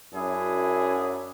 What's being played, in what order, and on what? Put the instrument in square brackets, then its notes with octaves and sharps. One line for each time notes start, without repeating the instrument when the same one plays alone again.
[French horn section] F#2 [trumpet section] D4 E4 G#4